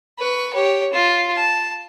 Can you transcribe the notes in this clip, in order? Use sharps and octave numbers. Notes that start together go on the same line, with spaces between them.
B4 C#6
G4 C#5
F4
A5